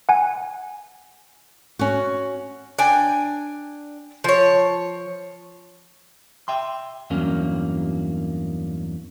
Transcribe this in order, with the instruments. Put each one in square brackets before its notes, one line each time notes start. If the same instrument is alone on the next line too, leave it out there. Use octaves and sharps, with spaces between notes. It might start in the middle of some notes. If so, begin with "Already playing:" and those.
[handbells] F#5 G#5
[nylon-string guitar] C#4 F#4
[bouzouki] D4 G5 G#5
F3 C#5
[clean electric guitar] E5 G5 C6
E2 G2 F#3 A#3 C#4